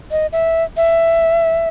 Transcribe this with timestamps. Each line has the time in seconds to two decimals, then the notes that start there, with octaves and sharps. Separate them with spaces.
0.11 D#5
0.33 E5
0.77 E5